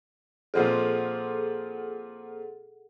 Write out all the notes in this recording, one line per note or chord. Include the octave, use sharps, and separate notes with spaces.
A#2 F3 C4 G#4 A4 F#5